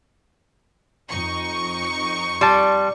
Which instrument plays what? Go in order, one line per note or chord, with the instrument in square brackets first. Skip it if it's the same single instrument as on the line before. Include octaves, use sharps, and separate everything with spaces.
[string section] F2 D#4 C#6
[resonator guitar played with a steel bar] G3 [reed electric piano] A5 C6